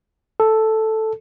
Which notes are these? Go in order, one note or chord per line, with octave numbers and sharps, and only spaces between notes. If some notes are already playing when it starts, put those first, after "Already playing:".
A4